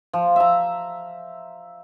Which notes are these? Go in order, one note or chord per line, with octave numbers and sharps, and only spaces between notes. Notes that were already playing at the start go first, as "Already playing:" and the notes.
F3
E5 A#5